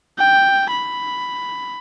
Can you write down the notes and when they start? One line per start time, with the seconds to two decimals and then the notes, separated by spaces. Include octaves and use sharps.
0.18 G5
0.71 B5